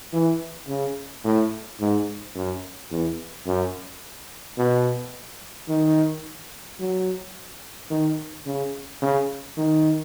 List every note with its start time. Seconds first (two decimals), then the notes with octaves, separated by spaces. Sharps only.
0.13 E3
0.68 C#3
1.25 A2
1.80 G#2
2.35 F#2
2.91 E2
3.46 F#2
4.57 B2
5.68 D#3
6.80 F#3
7.90 D#3
8.46 C#3
9.02 C#3
9.57 D#3